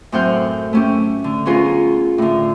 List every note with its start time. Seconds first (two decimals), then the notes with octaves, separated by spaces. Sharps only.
0.12 F#2 A2 C4 F#5 F6 G6
0.73 A3 C#4 G4
1.24 D3
1.46 B3 C#4 F4 G#4 A#4
2.18 A2 D3